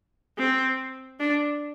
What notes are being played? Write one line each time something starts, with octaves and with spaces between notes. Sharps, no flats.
C4
D4